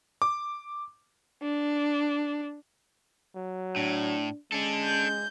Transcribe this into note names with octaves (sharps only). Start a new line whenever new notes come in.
D6
D4
F#3
A2 D4
G#3 C#4 D4 A4
G6